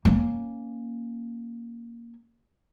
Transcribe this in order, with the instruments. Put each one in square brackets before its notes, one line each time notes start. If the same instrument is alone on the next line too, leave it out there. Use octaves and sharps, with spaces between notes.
[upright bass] A#3 C#4